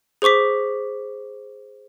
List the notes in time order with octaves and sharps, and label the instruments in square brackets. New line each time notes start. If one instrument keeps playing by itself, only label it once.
[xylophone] G#4 C5 C#6 D6 B6